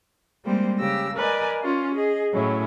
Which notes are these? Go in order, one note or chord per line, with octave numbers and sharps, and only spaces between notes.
G3 G#3 A#3 C4 C5
C#3 G4 E6 A#6
A#4 B4 D5 D#5 G#5
C#4 F4
G#4 D#5
A2 F#3 C#4 E4